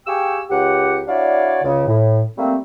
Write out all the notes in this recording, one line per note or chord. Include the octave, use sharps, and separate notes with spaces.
G4 G#4 F5 G5 C#6 E6
C#2 G4 F#5
D4 E4 F#4 C#5 D5 F5
C#2 C#3
A2
G3 A3 A#3 C4